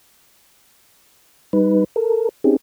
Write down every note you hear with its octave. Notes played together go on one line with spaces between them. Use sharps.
G3 D#4 B4
A4 A#4
C4 C#4 D#4 G4 G#4